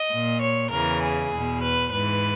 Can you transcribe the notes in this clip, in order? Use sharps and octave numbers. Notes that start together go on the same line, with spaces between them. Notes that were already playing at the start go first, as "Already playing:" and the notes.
Already playing: D#5
A#2
C#5
E2 C#3 E3 A#4
G#4
E2 B2
B4
G#2 E3 B4